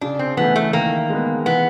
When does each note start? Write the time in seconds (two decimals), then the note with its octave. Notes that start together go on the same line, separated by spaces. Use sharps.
0.01 C#3 D4
0.19 C4
0.37 E3 A3 B3
0.56 A3
0.73 D#3 A#3
1.10 G#3 B3
1.45 E3 B3